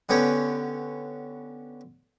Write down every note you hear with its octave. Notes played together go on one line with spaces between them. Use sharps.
D3 B3 C#4 G4 C#5